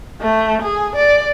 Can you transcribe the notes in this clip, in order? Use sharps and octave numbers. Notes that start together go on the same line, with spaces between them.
A3
G#4
D5